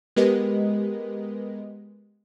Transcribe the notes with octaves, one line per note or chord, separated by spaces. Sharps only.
G#3 B3 G4 A#4 B4 D#5